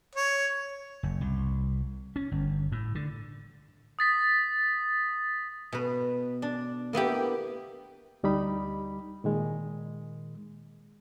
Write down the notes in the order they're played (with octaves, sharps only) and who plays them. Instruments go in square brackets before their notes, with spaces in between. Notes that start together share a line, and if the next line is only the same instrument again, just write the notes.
[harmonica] C#5
[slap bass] F#1
C2
C#4
G1
A2
D3
[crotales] D#6 A6 B6
[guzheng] B2 B4
D4
A#3 B3 E4 G4
[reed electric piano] D2 G3 D#4 B5
A#2 D#3 G#3